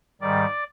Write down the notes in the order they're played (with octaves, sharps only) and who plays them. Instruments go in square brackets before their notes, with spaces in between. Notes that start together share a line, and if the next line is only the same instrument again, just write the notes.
[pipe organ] G#2 D#3 G3 D5